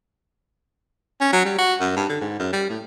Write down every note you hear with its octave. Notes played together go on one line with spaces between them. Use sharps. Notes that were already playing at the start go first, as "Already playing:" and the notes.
C#4
F#3
G3
F#4
F#2
G2
D3
G#2
F#2
G3
A2